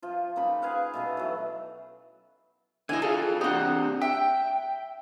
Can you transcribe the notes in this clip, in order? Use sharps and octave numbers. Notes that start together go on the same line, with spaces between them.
F3 F4
C#3 A#3 D#4 B5
G#4 B4 F5 F#5
B2 A3 D#5
E3 F#3
D3 E4 D#5 G#5
F4 G#4 A4
C4 D4 G4 D#5 F#5
E5 G5